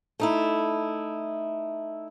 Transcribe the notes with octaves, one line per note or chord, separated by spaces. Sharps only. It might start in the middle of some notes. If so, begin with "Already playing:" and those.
A3 D#4 E4